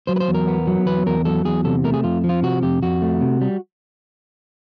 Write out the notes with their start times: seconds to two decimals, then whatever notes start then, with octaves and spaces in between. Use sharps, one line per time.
0.07 F#3 C5
0.16 B4
0.20 C5
0.28 E2
0.34 A#4
0.48 B3
0.67 F#3
0.86 E2 B4
1.06 E2 A#4
1.25 F#3 A4
1.45 E2 G#4
1.65 C3 A4
1.84 A3 A#4
1.94 G#4
2.03 F2 F4
2.24 F3
2.29 F4
2.42 C3 F#4
2.63 F2 G4
2.82 F2 F#4
3.02 A3
3.21 C3
3.41 G3